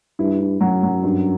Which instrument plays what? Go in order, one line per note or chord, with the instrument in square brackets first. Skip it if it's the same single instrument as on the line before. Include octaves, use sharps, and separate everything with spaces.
[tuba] G2 [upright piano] E4
[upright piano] E4
[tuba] F#2 [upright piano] F#3
[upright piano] F#3
G2